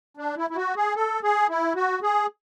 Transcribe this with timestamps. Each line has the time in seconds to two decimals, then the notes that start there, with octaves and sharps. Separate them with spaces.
0.17 D4
0.37 E4
0.50 E4
0.56 F#4
0.76 G#4
0.96 A4
1.23 G#4
1.49 E4
1.75 F#4
2.02 G#4